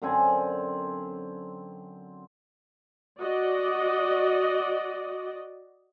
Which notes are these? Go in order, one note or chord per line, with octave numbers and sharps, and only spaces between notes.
F#2 D3 C4 G#5
F#4 D5 D#5